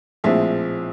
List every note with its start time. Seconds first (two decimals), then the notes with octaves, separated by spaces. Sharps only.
0.24 A#1 A2 F3 G#3 C4 E5